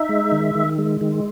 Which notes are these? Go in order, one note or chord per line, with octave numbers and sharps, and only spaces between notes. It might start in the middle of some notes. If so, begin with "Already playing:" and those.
Already playing: D#4 E5
G#3
D#3
D#3
G#3
D#3